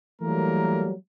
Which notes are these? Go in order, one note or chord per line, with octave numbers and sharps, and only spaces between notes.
E3 F#3 G3 A3 A#3 A#4